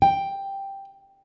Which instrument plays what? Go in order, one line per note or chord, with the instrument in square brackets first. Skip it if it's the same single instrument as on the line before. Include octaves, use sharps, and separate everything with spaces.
[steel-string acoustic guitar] G5